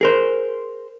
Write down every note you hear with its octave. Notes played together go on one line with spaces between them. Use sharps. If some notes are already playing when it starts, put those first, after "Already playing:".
G#4 A#4 C5